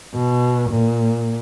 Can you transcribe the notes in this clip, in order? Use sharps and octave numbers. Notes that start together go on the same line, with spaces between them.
B2
A#2